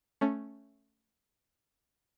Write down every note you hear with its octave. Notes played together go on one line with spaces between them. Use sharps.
A3 C#4